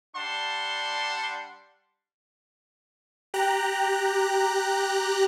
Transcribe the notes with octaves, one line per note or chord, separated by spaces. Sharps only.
G3 D4 F#5 A5 C6
G4 A#5 F#6